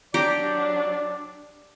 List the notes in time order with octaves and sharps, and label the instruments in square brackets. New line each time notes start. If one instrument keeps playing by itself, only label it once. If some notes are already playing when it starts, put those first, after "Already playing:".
[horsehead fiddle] F#3 D4 [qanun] G4 A#5 [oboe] D5